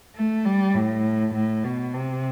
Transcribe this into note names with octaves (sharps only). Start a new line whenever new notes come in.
A3
G3
A2
A2
B2
C3